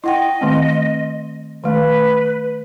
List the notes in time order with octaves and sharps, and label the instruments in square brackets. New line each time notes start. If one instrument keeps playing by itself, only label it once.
[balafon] E4 F#5 G5 [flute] D#5
[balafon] D#3 A3 C4
[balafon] D#3 A3 [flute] B4